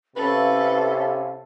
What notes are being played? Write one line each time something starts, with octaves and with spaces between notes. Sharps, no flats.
C3 C#4 E4 A4 B4 F5